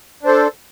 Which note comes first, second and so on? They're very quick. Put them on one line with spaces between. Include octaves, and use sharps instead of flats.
D4 C5 A4